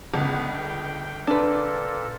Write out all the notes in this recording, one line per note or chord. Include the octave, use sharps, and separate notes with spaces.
G1 C#2 B3
G5
A#2 D4 A4 B4